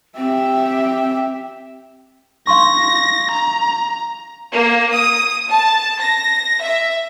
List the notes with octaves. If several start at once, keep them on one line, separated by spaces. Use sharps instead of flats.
C4 G4 E5
F5 C6 C#6 A#6
A#5
A#3
D#6
A5
A#6
E5